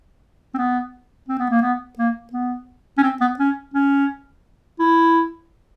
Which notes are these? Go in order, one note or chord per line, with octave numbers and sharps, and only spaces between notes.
C4
B3
C4
B3
A#3
B3
A#3
B3
C#4
C4
B3
C#4
C#4
E4